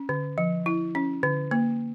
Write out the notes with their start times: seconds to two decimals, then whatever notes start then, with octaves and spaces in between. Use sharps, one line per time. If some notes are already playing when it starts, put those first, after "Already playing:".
Already playing: C#4
0.09 D3
0.38 F3
0.66 E4
0.95 C#4
1.23 D3
1.51 A#3